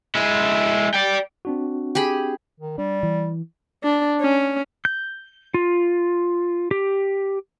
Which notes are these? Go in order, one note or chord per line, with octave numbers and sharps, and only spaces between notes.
G#3 E4
D5 G5
C4 D4 F#4
G4 G#4 B5
D#3
G3 D4
E3
D4
C#4
G6
F4
G4